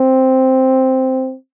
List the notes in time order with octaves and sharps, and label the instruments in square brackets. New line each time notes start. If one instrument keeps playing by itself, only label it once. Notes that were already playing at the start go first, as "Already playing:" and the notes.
Already playing: [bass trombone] C4